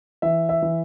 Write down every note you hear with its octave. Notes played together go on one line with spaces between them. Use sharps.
E3 E5
E5
E3